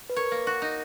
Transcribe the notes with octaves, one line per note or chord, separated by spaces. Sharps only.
B4
A#4 C#5
A#3
F#4
D#4